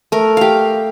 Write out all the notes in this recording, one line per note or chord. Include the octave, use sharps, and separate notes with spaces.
A3 A#4
G4 F5